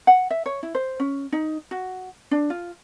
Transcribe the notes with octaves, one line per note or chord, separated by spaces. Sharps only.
F#5
E5
C#5
E4
C5
C#4
D#4
F#4
D4
F4